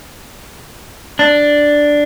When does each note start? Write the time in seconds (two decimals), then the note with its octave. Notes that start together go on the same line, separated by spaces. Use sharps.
1.19 D4